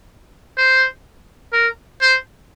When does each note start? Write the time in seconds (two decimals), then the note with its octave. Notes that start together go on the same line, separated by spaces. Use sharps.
0.58 C5
1.53 A#4
2.01 C5